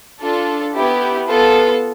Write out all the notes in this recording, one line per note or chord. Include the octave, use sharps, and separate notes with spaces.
D4 F4 A4
B3 E4 G4
B3 F4 A4